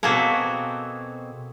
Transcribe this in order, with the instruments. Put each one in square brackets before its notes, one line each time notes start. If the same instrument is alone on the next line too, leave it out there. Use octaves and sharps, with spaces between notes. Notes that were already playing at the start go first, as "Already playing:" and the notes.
[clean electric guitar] B2 C4 G#4 [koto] A#3 F#4 A4